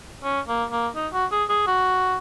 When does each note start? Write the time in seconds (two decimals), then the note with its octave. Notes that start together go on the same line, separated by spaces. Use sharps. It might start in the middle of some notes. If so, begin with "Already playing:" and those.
0.24 C#4
0.48 A#3
0.71 A#3
0.95 D#4
1.13 F#4
1.32 G#4
1.49 G#4
1.67 F#4